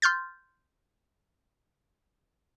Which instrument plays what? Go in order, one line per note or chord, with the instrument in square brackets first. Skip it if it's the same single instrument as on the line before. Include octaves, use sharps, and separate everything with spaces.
[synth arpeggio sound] C6 F6 G6 A6